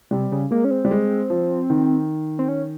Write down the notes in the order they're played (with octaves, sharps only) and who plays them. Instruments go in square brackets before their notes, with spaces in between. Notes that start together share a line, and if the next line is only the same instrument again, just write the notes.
[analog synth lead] C3 [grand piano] G3
[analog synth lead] C#3
[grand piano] G#3 [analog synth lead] A#3
[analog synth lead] C#4
C4
[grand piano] G3
G#3
F3
D#3
[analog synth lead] C4
C#4